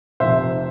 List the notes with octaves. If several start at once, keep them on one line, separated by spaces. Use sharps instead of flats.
F1 F2 C3 C5 E5